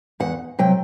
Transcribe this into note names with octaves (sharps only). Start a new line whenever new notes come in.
E2 F#5
C3 F#3 G5